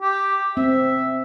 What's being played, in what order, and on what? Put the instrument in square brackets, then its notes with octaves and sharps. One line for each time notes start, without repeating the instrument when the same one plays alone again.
[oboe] G4
[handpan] C4 [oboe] E5